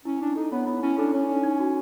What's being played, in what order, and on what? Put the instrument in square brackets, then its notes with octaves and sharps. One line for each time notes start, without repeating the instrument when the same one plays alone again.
[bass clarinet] C#4 [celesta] E4
[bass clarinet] D4 [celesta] E4
[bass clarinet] D#4 [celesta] A4
[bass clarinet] B3 [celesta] C#5
[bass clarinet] B3 [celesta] E4
[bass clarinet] C#4 [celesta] E4
[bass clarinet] D4 [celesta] A4
[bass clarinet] C#4 [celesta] C#5
[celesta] D#4
D#4
F#4